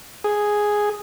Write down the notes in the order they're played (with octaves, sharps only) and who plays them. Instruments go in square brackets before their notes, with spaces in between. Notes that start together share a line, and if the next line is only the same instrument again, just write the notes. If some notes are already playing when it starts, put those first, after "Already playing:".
[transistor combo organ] G#4